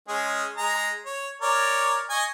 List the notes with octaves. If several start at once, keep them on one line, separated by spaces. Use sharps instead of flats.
G#3 C#4 G#4
G#3 G#4 A#5
C#5
A#4 C#5 D5
D#5 G#5 C#6